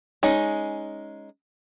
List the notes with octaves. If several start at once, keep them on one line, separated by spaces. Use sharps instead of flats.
G#3 C#4 D#4